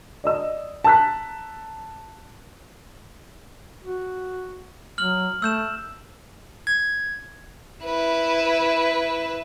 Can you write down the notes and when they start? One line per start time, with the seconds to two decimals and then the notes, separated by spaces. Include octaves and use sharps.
0.24 D5 D#5 E6
0.84 A5 A#5 E6 F#6 B6
3.84 F#4
4.98 F#3 F6 F#7
5.42 A3 E6 G6 E7
6.67 G#6
7.84 E4 B4